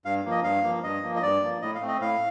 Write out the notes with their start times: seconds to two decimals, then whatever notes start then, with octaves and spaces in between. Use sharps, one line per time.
0.05 G2 F5
0.25 F3 A#3
0.31 D#5
0.44 G2 F5
0.64 F3 A#3
0.83 G2 D#5
1.03 F3 A#3
1.16 D#5
1.23 G2 D5
1.42 F3 A#3
1.62 A2 D#5
1.75 F5
1.81 A3 C4
1.88 D#5
2.01 A2 F5